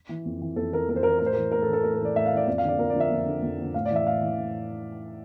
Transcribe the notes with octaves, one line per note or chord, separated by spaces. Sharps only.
E3
F2
E3
F2 A4
E3 A#4
F2 A#4
C5
E3 A#4
C5
A2 A#4
C5
E3 A#4
A2 A#4
A4
E3
A4
A2 A#4
A#4
E3 D5
A2 E5
F5
E3 D5
F2 D5
F5
D3 F3 D5
F2 A#4
D5
D3 F3
E5
F2
D3 F3
F2
D3 F3
A2 F5
D5
E3
E5
A2 F5
E3
A2